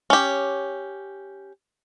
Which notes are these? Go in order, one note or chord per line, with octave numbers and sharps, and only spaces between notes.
C#4 G4